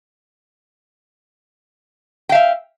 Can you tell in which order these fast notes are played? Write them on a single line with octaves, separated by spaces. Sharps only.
G5 F5 E5